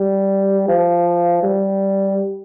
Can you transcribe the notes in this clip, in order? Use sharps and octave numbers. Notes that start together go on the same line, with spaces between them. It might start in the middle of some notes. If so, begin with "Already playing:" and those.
Already playing: G3
F3
G3